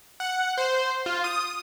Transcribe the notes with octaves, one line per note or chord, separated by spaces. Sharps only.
F#5
C5
F4
D#6